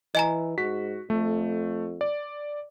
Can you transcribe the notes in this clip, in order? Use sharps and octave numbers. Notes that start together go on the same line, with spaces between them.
E3 D#5 G#5 A#5
G#2 F#4 B6
F2 A3
D5